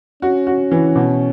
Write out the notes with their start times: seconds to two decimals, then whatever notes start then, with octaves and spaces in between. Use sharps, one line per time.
0.22 C#4 F#4
0.47 F#4
0.71 E3
0.96 B2